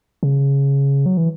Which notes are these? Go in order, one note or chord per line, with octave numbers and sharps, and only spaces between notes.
C#3
F#3
E3